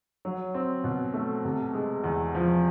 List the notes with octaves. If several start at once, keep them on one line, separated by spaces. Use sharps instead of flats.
F#3
C4
B2
A3
C3
G#3
E2
F3